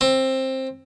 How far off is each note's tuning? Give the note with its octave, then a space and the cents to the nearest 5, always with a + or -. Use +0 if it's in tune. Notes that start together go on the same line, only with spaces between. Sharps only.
C4 +15